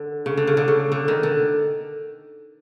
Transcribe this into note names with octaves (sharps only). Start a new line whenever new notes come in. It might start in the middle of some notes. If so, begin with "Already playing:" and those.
Already playing: D3
C#3
D3
C#3
D3
C#3
D3
D#3
D3